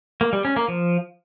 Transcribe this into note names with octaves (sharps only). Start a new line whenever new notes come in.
A#3
G3
C#4
A#3
F3